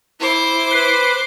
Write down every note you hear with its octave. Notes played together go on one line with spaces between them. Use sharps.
E4 C5 D6
B4